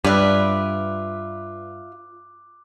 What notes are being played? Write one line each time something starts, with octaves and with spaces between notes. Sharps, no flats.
G2 F4 B4 D5 E5 D6 F#6